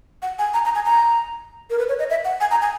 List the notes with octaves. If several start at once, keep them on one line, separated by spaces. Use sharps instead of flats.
F#5
G#5
A#5
A#5
G#5
A#5
A#4
B4
C#5
D#5
E5
F#5
G#5
A#5
G#5